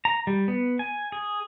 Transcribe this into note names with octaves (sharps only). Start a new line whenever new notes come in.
A#5
G3
B3
G#5
G#4